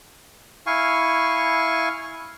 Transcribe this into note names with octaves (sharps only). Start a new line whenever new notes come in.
E4 F5 G#5 C#6